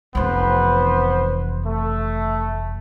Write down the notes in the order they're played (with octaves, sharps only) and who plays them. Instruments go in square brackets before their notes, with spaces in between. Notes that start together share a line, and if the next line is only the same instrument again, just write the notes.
[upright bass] F1 E3 [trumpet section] B3 B4 C5
[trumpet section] A3